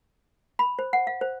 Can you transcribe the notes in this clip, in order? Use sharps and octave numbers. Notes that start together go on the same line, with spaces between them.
B5
C5
F#5
F5
C5